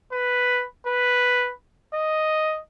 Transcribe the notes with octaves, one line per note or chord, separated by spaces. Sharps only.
B4
B4
D#5